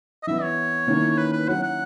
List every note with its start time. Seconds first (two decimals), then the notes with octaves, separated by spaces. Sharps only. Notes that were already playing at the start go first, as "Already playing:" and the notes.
0.23 D#5
0.27 E3 B3 E4 E5
0.43 C#5
0.87 D#3 A#3 C#4 E4
1.18 B4
1.33 B4
1.48 F#3 C#4 E4 F#5
1.63 F#5